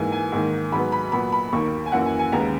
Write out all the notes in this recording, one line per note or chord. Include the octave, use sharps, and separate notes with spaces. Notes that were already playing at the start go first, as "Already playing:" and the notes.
Already playing: G#2 E3 A#3 G#5
G#5
G#2 D#3 A#3
G#2 F#3 B3 B5
B5
A#2 F#3 B3 B5
B5
D#2 D#3 A#3 C#6
G#5
F#2 E3 A#3 F#5
G#5
G#5
D#2 C#3 G#3 B3 A#5